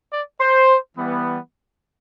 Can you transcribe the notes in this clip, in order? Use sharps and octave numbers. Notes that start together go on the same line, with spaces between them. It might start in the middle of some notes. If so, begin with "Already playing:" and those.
D5
C5
E3 G3 B3